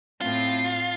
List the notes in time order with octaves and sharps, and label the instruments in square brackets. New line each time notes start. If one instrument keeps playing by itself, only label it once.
[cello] A2 C4 [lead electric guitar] F4